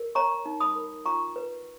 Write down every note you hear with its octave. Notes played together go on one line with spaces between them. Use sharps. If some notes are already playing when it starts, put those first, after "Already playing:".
Already playing: A#4
C#5 A#5 C#6
D#4
B5 D#6
A#4
F4 A#5 C#6
B4